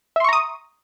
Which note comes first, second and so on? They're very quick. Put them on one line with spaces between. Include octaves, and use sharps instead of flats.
E5 C6 C#6 A#5 D#6